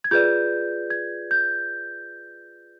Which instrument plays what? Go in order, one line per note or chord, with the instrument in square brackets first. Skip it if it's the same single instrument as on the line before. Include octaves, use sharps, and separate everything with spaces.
[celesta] G#6
F4 G#4 B4 D5 G6
G#6
G6